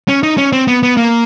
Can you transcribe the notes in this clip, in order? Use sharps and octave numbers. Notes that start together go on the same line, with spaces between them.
C#4
D#4
C#4
C4
B3
B3
A#3